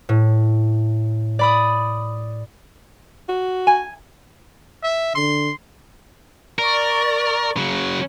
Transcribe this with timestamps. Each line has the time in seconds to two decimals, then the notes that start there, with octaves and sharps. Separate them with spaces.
0.09 A2
1.39 D5 B5 D#6
3.29 F#4
3.67 G#5
4.83 E5
5.15 D3 C6
6.58 A#4 D5 C#6
7.57 C#3 F#3